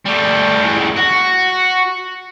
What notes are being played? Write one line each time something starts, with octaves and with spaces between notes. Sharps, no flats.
G3 A3
C#2 E3
F#4